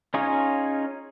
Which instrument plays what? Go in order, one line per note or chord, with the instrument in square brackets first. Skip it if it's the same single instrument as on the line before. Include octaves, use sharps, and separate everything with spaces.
[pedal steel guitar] C#4 D#4 F4 G#4 C#5